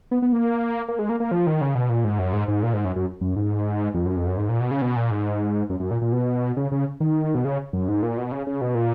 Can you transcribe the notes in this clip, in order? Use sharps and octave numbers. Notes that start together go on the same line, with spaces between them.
B3
B3
A#3
A#3
G#3
A#3
A#3
F3
D#3
C#3
B2
A#2
G#2
F#2
G#2
G#2
A#2
G#2
F#2
F#2
F#2
G#2
F2
F#2
F2
F#2
G#2
A#2
B2
C#3
B2
A#2
G#2
F#2
F#2
A#2
A#2
B2
C#3
C#3
D#3
B2
C#3
F#2
G#2
A#2
B2
C#3
C#3
B2
A#2